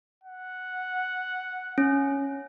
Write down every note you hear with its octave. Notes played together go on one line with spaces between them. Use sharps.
F#5
C#4